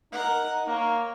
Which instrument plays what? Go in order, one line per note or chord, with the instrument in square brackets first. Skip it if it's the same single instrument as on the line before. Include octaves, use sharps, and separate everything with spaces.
[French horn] D#4 [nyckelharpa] A#4 F#5
[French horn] A#3 [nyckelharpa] C#5